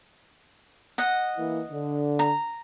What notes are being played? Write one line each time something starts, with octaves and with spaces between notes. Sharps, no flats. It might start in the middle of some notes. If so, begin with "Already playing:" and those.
D#5 F#5
E3 A#3 E4
D3
A#5